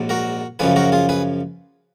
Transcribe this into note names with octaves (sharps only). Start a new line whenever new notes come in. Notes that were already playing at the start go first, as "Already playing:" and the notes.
Already playing: A#1 G#2 F#3
F#4 A#4
F#2 C#3 F3 G#4 B4
F#4 A#4
F4 G#4
G#4 B4